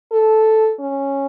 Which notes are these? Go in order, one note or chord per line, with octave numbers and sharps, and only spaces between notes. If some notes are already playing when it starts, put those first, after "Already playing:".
A4
C#4